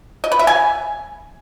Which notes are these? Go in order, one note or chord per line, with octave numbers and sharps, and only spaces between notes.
D#5
B4
E5
G#5